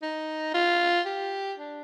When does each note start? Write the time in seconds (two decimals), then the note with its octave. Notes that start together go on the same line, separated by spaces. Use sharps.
0.02 D#4
0.54 F4
1.06 G4
1.58 D4